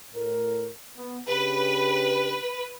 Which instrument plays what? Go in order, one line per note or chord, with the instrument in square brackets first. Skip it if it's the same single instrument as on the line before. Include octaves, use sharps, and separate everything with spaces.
[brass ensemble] A2 A#4
B3
[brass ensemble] C#3 D4 G4 [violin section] B4